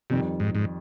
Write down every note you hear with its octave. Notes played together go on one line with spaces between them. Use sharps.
F2 C3 D#3 G3
G#2
G#2